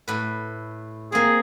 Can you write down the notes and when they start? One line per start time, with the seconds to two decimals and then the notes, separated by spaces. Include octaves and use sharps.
0.08 A2 B4
1.12 A#3 C4 G#4